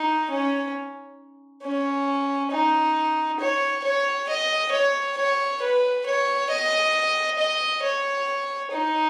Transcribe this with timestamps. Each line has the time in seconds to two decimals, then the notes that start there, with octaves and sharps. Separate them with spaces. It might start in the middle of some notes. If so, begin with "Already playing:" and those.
Already playing: D#4
0.30 C#4
1.63 C#4
2.51 D#4
3.40 C#5
3.84 C#5
4.29 D#5
4.72 C#5
5.17 C#5
5.62 B4
6.06 C#5
6.50 D#5
7.38 D#5
7.83 C#5
8.71 D#4